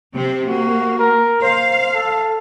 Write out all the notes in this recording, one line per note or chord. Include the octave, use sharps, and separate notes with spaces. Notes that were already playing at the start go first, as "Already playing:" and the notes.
C3 C4
A#3 F#4
A#4
C5 F5
A4